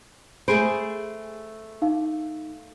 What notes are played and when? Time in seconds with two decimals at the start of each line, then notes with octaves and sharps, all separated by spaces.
0.48 A3 G#4 C5 B5 D7
1.82 D#4 F5